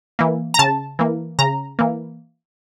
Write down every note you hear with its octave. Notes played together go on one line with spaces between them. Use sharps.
E3 A#3
A#5
C#3 A5
E3 A#3
C#3 A#5
E3 A#3